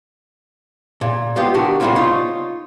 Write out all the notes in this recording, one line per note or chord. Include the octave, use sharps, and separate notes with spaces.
A#2
G#3 B3 F4 G4
D#3 D4 F#4 G4
A#2 D3 G3 G#3 C4 F4
D#4 F4 C#5